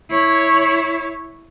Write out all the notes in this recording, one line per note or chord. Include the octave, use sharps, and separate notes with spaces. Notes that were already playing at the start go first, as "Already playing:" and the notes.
E4 C#5